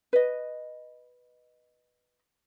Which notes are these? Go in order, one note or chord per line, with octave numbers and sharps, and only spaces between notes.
B4 D#5